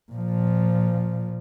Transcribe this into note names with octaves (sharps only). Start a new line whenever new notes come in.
A#2 F3